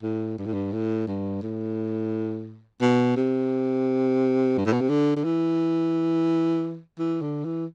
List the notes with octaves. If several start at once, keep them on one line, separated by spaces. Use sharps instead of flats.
A2
G2
A2
G2
A2
G2
A2
B2
C3
G2
A2
B2
C3
D3
D3
E3
E3
D3
E3